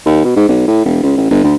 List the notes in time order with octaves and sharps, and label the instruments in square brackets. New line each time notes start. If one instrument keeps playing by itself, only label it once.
[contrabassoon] D#2
B2
G#2
B1
A2
E1
C#2
A1
G1
D2